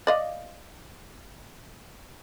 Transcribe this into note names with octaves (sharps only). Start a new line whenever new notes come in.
D5 D#5 F5